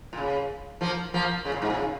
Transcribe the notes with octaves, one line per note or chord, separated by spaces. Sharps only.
A#2
C#3
F3 A#3
F3 A#3
C#3
A#2
G#2
A#2
C#3